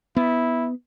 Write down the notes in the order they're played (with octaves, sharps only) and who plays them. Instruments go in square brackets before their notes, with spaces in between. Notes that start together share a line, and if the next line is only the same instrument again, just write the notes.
[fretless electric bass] B3 [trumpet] E4